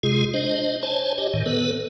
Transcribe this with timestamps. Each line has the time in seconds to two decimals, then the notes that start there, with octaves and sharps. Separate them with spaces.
0.03 C3 G#3 F4 G#4
0.34 D4 C5 D#5
0.83 C5 C#5 G#5 A5
1.18 G4 C#5 D#5
1.34 A2 D#3
1.46 B3 A4 B4